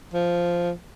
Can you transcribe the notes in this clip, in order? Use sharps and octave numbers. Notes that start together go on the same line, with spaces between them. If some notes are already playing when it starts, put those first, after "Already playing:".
F3